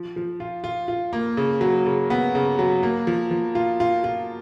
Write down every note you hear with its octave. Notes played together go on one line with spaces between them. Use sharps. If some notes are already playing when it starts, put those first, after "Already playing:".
Already playing: F3
F3
F4
F4
F4
A#3
C#3
F#3
C#3
B3
C#3
F#3
A#3
F3
F3
F4
F4
F4